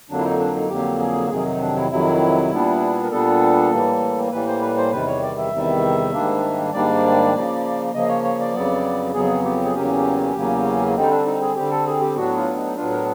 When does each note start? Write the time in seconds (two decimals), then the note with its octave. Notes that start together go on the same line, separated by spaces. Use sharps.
0.10 F2 D3 F#3 A#3 D4
0.19 E4
0.24 D#4
0.39 D4
0.55 D#4
0.69 F2 D3 F#3 A#3 G4
1.00 G#4
1.30 F2 C3 D#3 F#3 G#4
1.45 D#4
1.61 D4
1.75 E4
1.90 F2 C3 D#3 F#3 E4
2.51 A#2 G3 B3 D4
3.04 A#4
3.11 A#2 G3 B3 D4 A4
3.71 A2 E3 G3 A#3
4.32 A2 E3 G3 A#3 B4
4.47 C5
4.61 B4
4.77 C5
4.92 E2 C3 D#3 G3 B4
5.07 C#5
5.23 D5
5.38 E5
5.53 E2 C3 D#3 G3
6.13 G#2 D#3 G3 A#3 D4
6.73 G#2 D#3 G3 A#3 D4 D5
7.34 C#3 F3 A#3
7.94 C#3 F3 A#3 D#5
8.09 C#5
8.24 C#5
8.40 D5
8.54 F2 C#3 F#3 B3
9.14 F2 C#3 F#3 B3 G#4
9.45 G4
9.65 G#4
9.74 E2 C#3 F#3 A#3 C#4 G4
10.35 E2 C#3 F#3 A#3 C#4
10.96 D3 G3 C4 D#4
11.11 D4
11.26 D#4
11.42 G#4
11.56 D3 G3 C4 G4
11.71 A4
11.87 G#4
12.01 G4
12.16 A2 F#3 B3 D4 F#4
12.36 F4
12.56 D#4
12.77 A2 F#3 B3 D4 F4
12.92 A#4